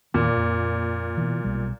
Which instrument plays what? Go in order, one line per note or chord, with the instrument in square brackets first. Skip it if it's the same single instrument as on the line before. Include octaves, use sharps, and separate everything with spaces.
[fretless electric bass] E2 D#3 A#3 [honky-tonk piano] A#2
[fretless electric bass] F2
B2 E3
B1 G3